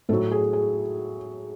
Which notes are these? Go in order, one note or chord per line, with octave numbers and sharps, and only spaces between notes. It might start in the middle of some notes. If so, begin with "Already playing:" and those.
A2 F#3 A4
G#4
G#4